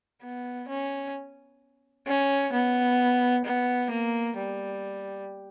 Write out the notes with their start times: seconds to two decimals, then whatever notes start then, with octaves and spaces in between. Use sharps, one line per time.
0.22 B3
0.68 C#4
2.07 C#4
2.53 B3
3.45 B3
3.91 A#3
4.38 G3